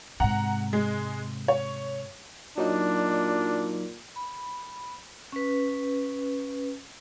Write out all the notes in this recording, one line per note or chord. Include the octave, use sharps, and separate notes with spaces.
G#2 C3 F#5 A#5
G#3
C#5
A#2 F#3 D4 D#4
B5
C#4 B4